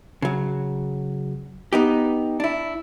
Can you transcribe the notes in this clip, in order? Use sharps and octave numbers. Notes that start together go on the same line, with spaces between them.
C#3 F#3
B3 D#4 G4
D4 E4